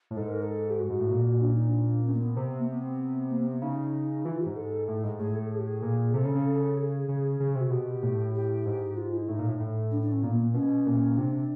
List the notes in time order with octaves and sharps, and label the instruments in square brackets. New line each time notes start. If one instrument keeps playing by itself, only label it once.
[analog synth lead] A2
[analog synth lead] G#2 [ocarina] A4
[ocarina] A#4
A4
G4
F#4
[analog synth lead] G#2
A2
A#2
[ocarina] D4
D#4
D4
C#4
A#3
B3
[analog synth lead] C3
[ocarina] A#3
B3
A#3
B3
[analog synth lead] C#3 [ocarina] D#4
[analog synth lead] E3 [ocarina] F4
[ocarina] G4
[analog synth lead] G#2
[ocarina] A4
[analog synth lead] A2
G#2
[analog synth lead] A2 [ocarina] G#4
[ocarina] A4
G#4
G4
G#4
[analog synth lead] A#2
[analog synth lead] C3 [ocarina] A4
[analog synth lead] C#3
C#3
[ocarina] G#4
[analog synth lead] C#3
C#3
C3
[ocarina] F#4
[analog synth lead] B2 [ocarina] G4
[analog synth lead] A2
[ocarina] G4
[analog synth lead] G#2
[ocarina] F4
E4
[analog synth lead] A2 [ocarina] D#4
[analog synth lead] A#2
A2
A2
[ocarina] D4
D4
C#4
[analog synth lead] A#2 [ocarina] B3
[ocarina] A#3
[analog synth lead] B2 [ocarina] C#4
[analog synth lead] A#2
[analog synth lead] C3 [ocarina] D4